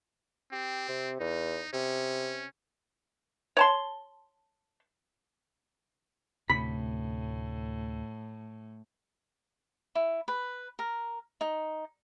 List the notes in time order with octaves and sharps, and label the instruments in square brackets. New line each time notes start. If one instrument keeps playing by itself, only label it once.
[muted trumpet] C4 [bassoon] G4
[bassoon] C3
[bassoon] E2 [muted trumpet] D#4
[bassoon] C3 [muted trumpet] C#4
[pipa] C#5 A5 C6
[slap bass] D2 C3 [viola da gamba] A2 [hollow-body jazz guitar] B5
[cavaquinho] E4
B4
A#4
D#4